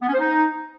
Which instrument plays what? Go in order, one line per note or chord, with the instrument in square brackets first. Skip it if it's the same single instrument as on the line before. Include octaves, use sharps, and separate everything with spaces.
[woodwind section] B3
C#4
C5
D#4